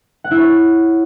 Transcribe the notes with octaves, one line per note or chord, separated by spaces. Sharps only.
F#5
E4
C#5